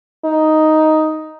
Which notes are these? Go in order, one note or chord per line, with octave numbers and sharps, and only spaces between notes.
D#4